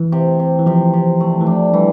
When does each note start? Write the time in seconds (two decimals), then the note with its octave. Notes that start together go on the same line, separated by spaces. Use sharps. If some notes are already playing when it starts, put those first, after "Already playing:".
Already playing: E3
0.12 C3
0.40 C3
0.59 E3
0.66 C3 F3
0.93 C3
1.20 A3
1.41 E3
1.46 F3 D4
1.74 E3 G3